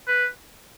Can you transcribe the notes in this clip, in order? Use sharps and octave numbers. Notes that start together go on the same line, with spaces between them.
B4